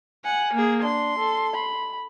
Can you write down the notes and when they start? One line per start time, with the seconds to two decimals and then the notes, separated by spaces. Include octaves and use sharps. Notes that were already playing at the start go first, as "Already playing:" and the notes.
0.24 F#5 G#5
0.53 A#3 G#4
0.83 D4 C6
1.19 A4
1.54 B5